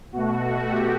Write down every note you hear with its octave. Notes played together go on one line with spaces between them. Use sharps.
B2 A3 F#4
G4